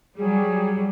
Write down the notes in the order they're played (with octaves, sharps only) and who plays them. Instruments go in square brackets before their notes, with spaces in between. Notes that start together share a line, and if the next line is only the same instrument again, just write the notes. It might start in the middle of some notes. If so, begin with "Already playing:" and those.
[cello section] F#3 G3 [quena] G#4